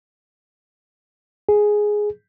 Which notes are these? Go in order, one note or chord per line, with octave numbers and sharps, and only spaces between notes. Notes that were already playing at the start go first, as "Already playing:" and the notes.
G#4